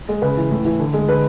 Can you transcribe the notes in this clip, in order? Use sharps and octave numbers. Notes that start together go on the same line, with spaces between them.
G#3
C#3 B4
E3
A2
E3
D3
G#3
D3 B4